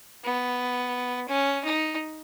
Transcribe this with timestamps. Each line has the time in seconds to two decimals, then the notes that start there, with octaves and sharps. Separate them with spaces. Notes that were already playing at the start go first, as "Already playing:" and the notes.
0.24 B3
1.29 C#4
1.64 D#4